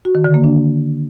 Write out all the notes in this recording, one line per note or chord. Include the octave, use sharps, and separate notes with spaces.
F#4
D#3
D3
A#3
D4